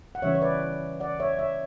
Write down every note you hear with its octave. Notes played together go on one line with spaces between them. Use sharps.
F#5
C#3 E3 G3 C#4 E4 C#5 E5
C#5
B4 D5
D5 F#5
C#5 E5
C#5 E5